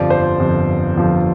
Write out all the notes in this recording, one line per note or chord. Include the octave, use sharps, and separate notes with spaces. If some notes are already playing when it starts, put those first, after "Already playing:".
Already playing: G1 F2 F3 D5
C5
G1 F2 F3
G1 F2 F3